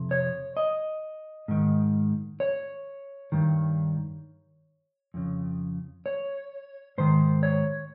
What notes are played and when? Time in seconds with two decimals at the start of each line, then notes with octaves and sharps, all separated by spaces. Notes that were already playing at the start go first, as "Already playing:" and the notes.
Already playing: F2 C3
0.11 C#5
0.57 D#5
1.48 G#2 D#3
2.40 C#5
3.32 G2 D#3
5.14 F2 C#3
6.06 C#5
6.98 G#2 D#3 C5
7.43 C#5